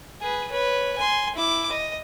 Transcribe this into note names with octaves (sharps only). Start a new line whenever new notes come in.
G#4 B4
B4 C#5
G#5 C6
E4 D6
D#5